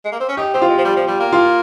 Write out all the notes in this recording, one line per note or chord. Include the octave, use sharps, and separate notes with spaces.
G#3
A#3
C4
C#4
D#4 G4
C4 G4
F4
G#3
F3
G3
F3
G3
A#3
F4